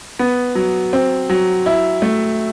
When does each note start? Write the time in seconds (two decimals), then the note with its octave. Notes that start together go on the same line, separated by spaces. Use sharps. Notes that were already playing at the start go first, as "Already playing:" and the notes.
0.19 B3
0.55 F#3
0.93 C4
1.29 F#3
1.66 E4
2.02 A3